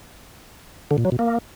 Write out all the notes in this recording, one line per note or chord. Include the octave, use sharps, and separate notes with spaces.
D3
A#2
F#3
B2
A#3